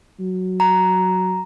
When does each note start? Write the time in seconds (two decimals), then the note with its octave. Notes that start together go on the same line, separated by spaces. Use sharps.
0.20 F#3
0.60 A#5